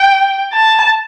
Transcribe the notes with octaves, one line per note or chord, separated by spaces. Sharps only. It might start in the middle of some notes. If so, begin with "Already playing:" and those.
Already playing: G5
A5